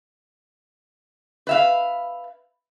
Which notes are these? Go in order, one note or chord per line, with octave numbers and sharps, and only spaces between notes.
B4 E5 F5